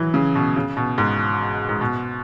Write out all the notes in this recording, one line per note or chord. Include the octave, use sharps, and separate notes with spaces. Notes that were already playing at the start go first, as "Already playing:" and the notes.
Already playing: E3 F#3
C#3
B2
C#3
B2
G#2
G#2
B2